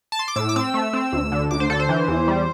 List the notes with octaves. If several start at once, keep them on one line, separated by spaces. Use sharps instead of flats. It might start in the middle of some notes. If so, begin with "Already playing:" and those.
A5
C6
D6
A2 E6
D6
C4 E6
A3
C4
D2
D3
D2 D6
C5
D3 A4
C5
E3
E2
G3